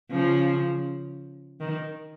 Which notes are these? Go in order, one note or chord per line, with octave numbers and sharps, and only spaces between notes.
C#3 F3
D#3